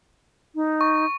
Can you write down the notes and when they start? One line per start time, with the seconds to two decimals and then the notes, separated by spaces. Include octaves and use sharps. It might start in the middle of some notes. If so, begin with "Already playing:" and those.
0.55 D#4
0.81 C#6